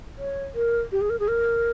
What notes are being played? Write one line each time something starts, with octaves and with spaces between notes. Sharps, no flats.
C#5
A#4
G4
G#4
A#4
G#4
A#4